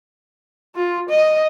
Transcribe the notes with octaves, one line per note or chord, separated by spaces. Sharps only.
F4
D#5